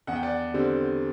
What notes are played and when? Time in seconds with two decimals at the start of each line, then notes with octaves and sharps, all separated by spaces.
0.07 E2 F#5
0.16 G5
0.23 D5 F#5
0.54 D3 G3 C4